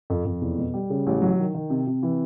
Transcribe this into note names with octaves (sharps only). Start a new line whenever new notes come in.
F2
F2
E2
B2
G3
C#3
A1
F#3
D#3
D#3
C3
C3
E3